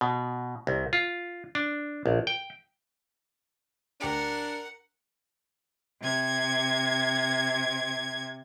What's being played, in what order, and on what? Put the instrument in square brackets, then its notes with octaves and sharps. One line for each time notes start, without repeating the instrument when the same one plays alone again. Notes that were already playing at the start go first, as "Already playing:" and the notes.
[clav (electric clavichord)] B2
C2
F4
D4
A#1
G5
[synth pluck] D2 G4 D7 [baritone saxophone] D4 [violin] A#4 [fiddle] F#5
[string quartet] C3 G#6